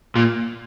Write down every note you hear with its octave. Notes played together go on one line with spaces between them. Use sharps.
A#2